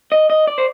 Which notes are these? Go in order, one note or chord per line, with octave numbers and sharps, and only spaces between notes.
D#5
D#5
D5
C5